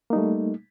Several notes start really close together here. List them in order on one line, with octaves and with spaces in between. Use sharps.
A#3 D#4 G3 A3